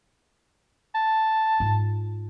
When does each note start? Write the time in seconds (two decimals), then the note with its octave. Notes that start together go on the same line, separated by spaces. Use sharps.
0.94 A5
1.60 G#2 F4